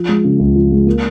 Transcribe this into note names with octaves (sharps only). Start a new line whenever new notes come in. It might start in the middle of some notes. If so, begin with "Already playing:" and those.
Already playing: F3
G#3
C#3
C#2
F3
G#3
A#3